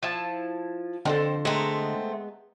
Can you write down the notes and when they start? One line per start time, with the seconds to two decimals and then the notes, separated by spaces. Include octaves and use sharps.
0.03 F3 E4 A5
1.05 F2 D3 A4 C5 G5
1.45 G#3 A3 B3 C4 A#5